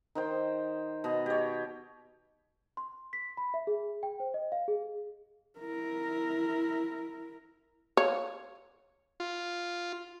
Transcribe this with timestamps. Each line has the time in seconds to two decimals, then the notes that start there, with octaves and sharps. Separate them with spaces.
0.15 D#3 C5 G5
1.04 B2 D#5
1.26 G4 C#5
2.77 C6
3.13 B6
3.37 B5
3.54 E5
3.67 G#4
4.03 G5
4.20 C5
4.34 D#5
4.52 F5
4.68 G#4
5.59 E4 A#4
7.97 C#5 F5
9.20 F4